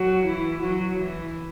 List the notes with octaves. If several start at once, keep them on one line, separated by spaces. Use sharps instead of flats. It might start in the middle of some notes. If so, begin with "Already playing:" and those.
Already playing: F#3 F#4
E3 E4
F#3 F#4
E3 E4